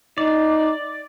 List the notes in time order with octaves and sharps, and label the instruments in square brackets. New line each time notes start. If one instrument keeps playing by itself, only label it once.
[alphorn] D#4 [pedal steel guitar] D5